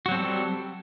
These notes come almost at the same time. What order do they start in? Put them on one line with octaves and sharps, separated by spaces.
F#4 F#3 C4 A4 G3